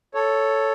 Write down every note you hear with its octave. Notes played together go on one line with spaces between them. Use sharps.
A4 C#5